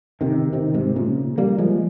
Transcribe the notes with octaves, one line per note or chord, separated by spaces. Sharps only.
C3 D#3
C3 D#3
G#2 C3
A#2 C#3
G3 A#3
F3 G#3